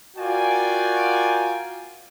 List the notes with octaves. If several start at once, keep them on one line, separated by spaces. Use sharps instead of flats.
F4 F#4 A#4 D5 G5 G#5